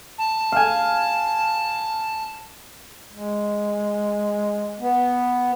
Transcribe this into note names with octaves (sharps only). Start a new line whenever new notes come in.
A5
F5 G#5
G#3
B3